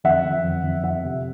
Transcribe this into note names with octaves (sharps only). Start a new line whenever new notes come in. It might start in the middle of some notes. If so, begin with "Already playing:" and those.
F2 E5 F#5
F2
F2
F2
F2 E5 F#5
C3